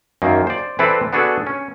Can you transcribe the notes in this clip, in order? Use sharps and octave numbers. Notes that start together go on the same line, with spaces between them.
F#2 D#3 A#3
C5 D5
E3 C4 E4 A4 B4 D5
B3 D4 F#4 G#4 A4
C#4